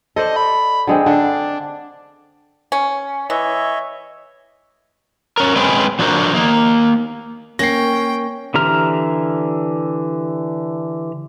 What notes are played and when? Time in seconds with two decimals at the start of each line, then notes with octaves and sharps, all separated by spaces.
0.16 A4 C5 D5 D#5
0.36 B5
0.87 D3 G#3 C4
1.06 D3 D4
2.72 C#4
3.30 E3 C#5 D#5 E5
5.38 C#4 A#4
5.56 G#3 C4 C#4 G#4 B4 G5
5.99 F3 D4 F#4 A#4 C5
6.35 A#3 D#4
7.59 A#3 C#4 G5 A#6 C7
8.54 D3 E3 G4 A#5 F6